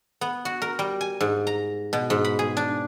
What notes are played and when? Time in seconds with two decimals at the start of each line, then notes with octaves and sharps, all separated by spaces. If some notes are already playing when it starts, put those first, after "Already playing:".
0.21 B3
0.45 F#4
0.62 A#4
0.79 G3
1.01 G#5
1.21 G#2
1.47 A#5
1.93 B2
2.10 G#2
2.24 B5
2.39 G#4
2.57 D4